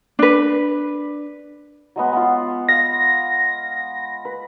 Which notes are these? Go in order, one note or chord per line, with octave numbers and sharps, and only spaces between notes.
D4 B4
F#3 G#3 B3
B3 F4
F5 A#6
B4